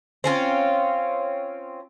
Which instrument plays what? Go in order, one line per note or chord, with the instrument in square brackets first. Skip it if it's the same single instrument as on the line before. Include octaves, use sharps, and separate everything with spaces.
[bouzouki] C4 C#4 F4